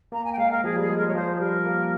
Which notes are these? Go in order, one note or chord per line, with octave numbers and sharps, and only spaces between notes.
A#3 A#5
G#5
G5
G#3 F5
A#4
F3 G#4
G3 G#4
G#3
A#4
G#3
C#5
F3 C5
G#4
G3 A#4
A#3